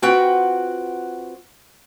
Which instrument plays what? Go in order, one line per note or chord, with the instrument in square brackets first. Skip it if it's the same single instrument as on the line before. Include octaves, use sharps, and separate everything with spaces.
[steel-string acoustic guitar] C4 F4 F#4 B4 F#5 G5